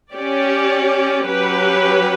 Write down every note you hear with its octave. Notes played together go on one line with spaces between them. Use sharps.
C#4 G4 D5
F#3 C#4 G4 B4